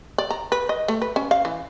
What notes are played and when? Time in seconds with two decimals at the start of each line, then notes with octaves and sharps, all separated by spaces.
0.18 D5
0.31 A#5
0.52 B4
0.69 D#5
0.88 A3
1.02 B4
1.16 C#4
1.31 F5
1.45 E3